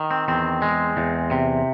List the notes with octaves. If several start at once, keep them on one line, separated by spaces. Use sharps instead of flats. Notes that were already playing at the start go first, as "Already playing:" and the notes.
Already playing: D#3
C4
E2 C4
G#3
E2
C3